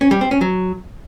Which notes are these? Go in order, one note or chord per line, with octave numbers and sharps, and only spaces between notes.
C#4
G3
C4
C#4
F#3